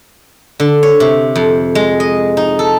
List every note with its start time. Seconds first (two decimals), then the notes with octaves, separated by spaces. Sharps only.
0.60 D3
0.83 C#5
1.00 C3
1.36 F2
1.75 G#3
2.00 D#5
2.37 D#4
2.59 A4